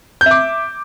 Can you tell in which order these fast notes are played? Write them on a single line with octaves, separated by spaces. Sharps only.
G6 E5 D6